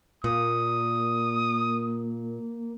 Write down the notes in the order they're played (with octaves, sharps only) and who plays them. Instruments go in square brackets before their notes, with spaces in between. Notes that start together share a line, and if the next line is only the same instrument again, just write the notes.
[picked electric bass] A#2 [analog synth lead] A#3 [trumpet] D#6